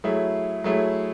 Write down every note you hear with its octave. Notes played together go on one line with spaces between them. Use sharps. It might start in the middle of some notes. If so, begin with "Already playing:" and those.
F#3 A3 E4 G#4
F#3 A3 E4 G#4